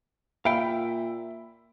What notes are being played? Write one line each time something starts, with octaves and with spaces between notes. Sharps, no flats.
A#2 E5 F5 G5 B5